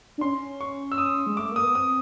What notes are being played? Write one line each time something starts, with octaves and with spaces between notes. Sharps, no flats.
D4
C#4 C6
C#6
E6
D#6
G#3
A3 D6
A#3 D#6
B3
C4 D#6